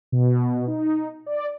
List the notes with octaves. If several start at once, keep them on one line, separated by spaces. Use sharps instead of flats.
B2
D#4
D5